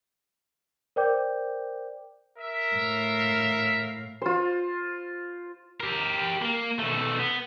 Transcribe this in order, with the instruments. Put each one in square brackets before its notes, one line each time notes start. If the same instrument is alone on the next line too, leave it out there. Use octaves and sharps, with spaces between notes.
[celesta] A#4 C5 D5 G5 D6 G6
[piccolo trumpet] A#4 [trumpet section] E5
[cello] A2 F5
[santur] F4 C5
[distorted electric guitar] G4 A#4
A#3
B1 A3
B3